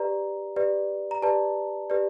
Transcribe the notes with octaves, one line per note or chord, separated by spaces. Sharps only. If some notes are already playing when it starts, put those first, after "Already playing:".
Already playing: G4 B4 D5 A#5
G4 B4 D5
A#5
G4 B4 D5 A5
G4 B4 D5